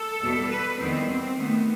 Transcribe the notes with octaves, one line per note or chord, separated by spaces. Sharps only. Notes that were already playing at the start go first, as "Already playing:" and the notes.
Already playing: A4
E2 B2 G3
B4
E2 D#3 G3 B3 C4
C4
C3 D#3 A3 B3